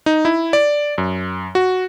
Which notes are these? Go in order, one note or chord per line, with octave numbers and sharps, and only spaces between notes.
D#4
E4
D5
F#2
F#4